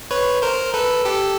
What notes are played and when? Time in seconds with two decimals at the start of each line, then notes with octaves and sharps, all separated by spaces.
0.11 B4 C#5
0.42 A#4 C5
0.74 A4 B4
1.05 G4 A4